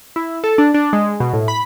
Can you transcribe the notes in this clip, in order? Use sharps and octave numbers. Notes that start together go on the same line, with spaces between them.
E4
A4
D4
D4
G#3
B2
A2
B5